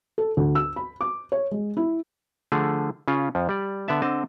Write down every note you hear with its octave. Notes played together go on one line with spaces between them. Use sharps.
A4
D2
E6
B5
D6
C#5
G#3
E4
D3 F3 A3 G#4
C#3 C#4 F4
F2 F3
G3 D5
D3 B3 D5 E5 A5
D3 C4 D#5 A5